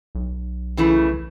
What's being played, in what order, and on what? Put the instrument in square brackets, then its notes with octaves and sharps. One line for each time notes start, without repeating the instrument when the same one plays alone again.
[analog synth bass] B1
[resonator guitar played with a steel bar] C#3 E3 A3